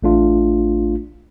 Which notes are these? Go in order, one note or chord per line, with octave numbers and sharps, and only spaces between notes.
A1 A3 D4 F4